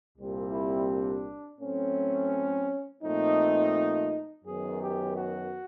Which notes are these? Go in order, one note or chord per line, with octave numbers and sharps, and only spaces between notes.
C2 A#2 G3 C4
E4
D4
A2 F#3 A3 C4 C#4
A#2 F3 A3 C4 D#4
F#2 D#3 F#3 B3 G#4
G4
F#4